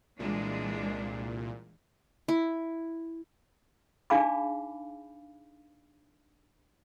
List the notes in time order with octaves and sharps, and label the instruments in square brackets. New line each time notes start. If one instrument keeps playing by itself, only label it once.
[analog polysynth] C2 A#2 [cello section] E3 G#3 D4
[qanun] E4
[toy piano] D4 D#4 G#4 F5 B5 D6